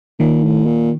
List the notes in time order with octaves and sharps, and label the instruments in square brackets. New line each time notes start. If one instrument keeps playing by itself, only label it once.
[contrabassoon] A#2 [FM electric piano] D#3
[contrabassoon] A2
A#2